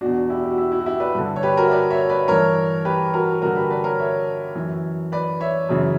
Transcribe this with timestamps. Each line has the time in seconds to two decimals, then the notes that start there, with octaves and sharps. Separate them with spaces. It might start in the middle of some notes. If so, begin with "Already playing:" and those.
0.01 E2 B2 D4 F#4
0.30 E4 G4
0.43 G4
0.50 F#4
0.58 E4
0.72 E4
0.80 F#4
0.86 E4 G4
1.00 B4 D5
1.15 G2 D3
1.36 C#5
1.43 G4 B4
1.57 F#4 A#4
1.66 E5
1.72 B4 D5
1.90 C#5 E5
2.09 B4 D5
2.28 G2 E3 A#4 C#5
2.85 G4 B4
3.14 F#4 A#4
3.42 G2 D3 F#4 A#4
3.56 G4 B4
3.70 B4 D5
3.84 A#4 C#5
3.99 C#5 E5
4.55 F#2 E3
5.12 B4 D5
5.41 C#5 E5
5.69 F#2 C#3 E3